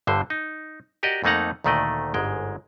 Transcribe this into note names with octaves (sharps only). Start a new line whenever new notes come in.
G1 G2 D3 C5
D#4
F#4 G4 A#4 D5 D#5 F#5
F2 A3 A#3 D#4 F#5 A#5
D2 A#2 D#3 A3 D5 D#5
G1 G#2 G#3 G5